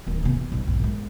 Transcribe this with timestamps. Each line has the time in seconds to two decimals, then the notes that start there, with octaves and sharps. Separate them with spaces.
0.07 D1 D#2
0.23 C3 B3
0.36 E3
0.52 D#1 A1
0.67 B1 G#2
0.79 A#2 G#3